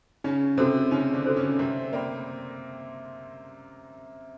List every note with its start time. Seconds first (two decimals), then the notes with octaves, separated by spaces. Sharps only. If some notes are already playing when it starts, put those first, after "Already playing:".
0.24 C#3 C#4 D#4
0.58 C3 C4 F#4 A4 C5
0.91 C#3 C#4 D#4
1.14 D3 D4
1.26 F#4 A4 C5
1.37 C#3 C#4
1.59 C3 C4 A#4
1.93 A#3 D5 G5 B5